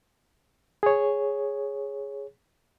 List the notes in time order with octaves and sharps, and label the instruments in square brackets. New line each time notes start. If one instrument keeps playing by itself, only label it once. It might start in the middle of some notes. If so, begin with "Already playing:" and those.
[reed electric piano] G#4 C#5